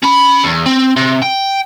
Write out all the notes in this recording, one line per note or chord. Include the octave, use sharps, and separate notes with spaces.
C#4 B5
E2
C4
C3
G5